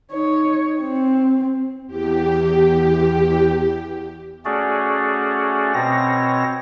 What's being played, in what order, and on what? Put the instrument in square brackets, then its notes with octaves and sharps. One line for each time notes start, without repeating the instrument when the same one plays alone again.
[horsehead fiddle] D#4 C#5
C4
[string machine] E2 G4
[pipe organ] A3 C#4 F#4 G#4 D5
B2 C4 C#5 A#6